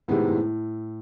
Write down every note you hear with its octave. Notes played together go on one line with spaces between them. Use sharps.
A2 C3 D#3 G#3 B3
A2